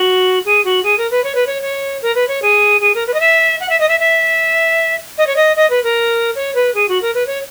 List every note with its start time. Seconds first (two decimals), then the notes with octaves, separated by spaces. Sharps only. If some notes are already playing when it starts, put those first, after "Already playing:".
Already playing: F#4
0.45 G#4
0.65 F#4
0.83 G#4
0.98 A#4
1.11 B4
1.24 C#5
1.35 B4
1.47 C#5
1.62 C#5
2.02 A#4
2.15 B4
2.28 C#5
2.42 G#4
2.81 G#4
2.95 A#4
3.07 B4
3.14 D#5
3.20 E5
3.60 F#5
3.70 E5
3.80 D#5
3.89 E5
4.00 E5
5.18 D#5
5.27 C#5
5.36 D#5
5.56 D#5
5.70 B4
5.84 A#4
6.35 C#5
6.55 B4
6.75 G#4
6.89 F#4
7.02 A#4
7.14 B4
7.27 C#5